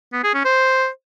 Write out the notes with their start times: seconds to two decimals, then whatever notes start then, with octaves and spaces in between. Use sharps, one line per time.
0.13 B3
0.23 G#4
0.34 C#4
0.45 C5